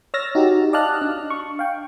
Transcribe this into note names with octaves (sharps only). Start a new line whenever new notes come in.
C#5 E6 F6 A6 A#6
D#4 F#4 G4
D5 D#5 F5 A5 F6 F#6
D4
C#6
F5 G5